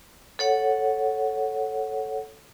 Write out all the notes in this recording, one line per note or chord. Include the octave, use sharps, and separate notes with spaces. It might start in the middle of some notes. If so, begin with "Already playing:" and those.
A4 C#5 F#5